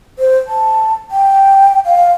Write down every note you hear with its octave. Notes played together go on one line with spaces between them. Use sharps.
C5
A5
G5
F5